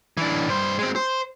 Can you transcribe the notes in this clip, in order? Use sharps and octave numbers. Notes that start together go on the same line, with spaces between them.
E3 D4
G2 C5
G#3 C4
C5